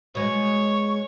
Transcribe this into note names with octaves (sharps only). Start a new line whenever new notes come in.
B2 G#3 C#5 C#6